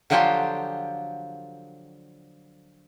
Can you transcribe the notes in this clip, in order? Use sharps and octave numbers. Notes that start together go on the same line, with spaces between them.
D3 F3 F#3 F4 G4 G5